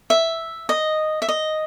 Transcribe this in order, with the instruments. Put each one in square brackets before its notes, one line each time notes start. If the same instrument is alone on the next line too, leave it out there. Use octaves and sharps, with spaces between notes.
[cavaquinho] E5
D#5
E5
D#5